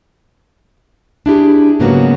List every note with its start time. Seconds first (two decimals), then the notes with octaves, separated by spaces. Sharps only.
1.26 D4 E4 G4 G#4
1.80 G#2 C#3 F#3 A#3 B3 F#4